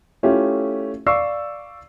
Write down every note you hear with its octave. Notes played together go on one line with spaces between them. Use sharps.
A3 C#4 E4 F4 G4 A4
D5 F5 C#6 E6 C7